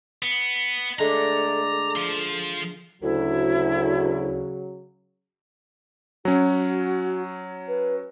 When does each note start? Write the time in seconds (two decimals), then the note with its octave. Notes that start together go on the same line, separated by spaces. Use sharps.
0.22 B3
0.99 D3 G#3 A3 D5 A#5
1.96 F3 F4
3.02 D2 C#3 F#3 E4
6.25 F#3 C#4 F#4
7.68 B4